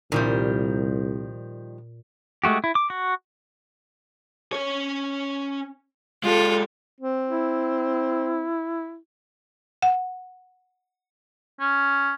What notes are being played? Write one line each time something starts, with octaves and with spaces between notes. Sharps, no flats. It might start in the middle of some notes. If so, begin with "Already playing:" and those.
C2 A#2 D#3 F3 G3
G#3 A3 F#4 G4
E4
D6
F#4
C#4 C#5
G#3 F4 G4 A4
C4
E4
F#5
C#4